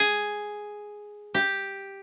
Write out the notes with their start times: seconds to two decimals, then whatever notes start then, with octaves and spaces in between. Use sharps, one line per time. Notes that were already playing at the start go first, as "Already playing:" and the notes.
Already playing: G#4
1.34 G4